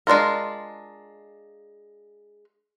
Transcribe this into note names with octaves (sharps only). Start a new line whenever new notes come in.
G#3 D4 F4 A#4